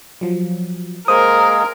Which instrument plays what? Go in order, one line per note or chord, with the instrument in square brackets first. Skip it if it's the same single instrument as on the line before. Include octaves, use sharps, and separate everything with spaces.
[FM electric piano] F3 F#3
[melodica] G#3 A#3 G#4 [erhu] A#4 [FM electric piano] C5 [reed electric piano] D#6